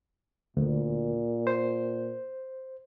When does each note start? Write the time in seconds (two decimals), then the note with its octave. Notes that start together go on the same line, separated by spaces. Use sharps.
0.57 D2 A#2
1.47 C5